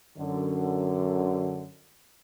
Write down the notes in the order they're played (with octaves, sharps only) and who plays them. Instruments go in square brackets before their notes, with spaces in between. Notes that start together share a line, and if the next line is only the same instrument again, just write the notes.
[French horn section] F#2 D3